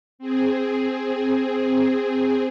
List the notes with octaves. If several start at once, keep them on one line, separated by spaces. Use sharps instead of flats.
C4 G#4